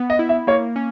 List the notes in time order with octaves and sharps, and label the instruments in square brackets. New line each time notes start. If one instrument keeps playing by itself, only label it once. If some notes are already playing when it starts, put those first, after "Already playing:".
Already playing: [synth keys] B3
[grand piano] D#5
[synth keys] E4
[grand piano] E5
[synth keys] A#3 [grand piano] C#5
[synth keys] C#4